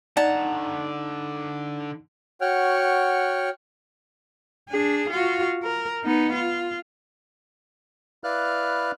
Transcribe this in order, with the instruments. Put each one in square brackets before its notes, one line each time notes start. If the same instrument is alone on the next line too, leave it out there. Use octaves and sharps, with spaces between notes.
[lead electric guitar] D3 A#5 [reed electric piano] D#4 [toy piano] D5 [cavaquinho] F#5 A5
[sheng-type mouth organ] F#4 C#5 F#5 G5 F6
[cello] D4 G#4
F4 F#4
A#4
B3 D#4
F4
[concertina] E4 B4 D5 F5 F6 F#6